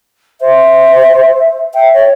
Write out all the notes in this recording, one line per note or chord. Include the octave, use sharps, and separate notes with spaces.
C5 E5
E5 G5
C#5